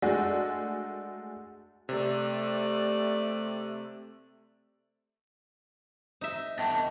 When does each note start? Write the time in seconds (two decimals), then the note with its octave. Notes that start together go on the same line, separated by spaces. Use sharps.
0.02 G#3 A3 D4 F#4
1.89 C3 A3 C4 D5
6.21 D#4 E5
6.59 B3 D#5 G5 A5